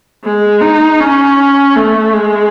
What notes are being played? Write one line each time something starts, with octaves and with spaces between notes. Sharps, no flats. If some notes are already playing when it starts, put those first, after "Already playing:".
G#3
D#4
C#4
A3
G#3